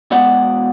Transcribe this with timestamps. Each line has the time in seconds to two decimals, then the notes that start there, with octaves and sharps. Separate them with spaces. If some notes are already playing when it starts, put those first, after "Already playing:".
0.11 B2 G#3 B3 D5 F#5